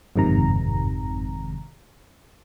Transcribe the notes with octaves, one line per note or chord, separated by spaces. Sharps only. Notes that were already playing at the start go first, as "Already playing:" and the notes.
G1 F2 G#2 C3 D#3 A#5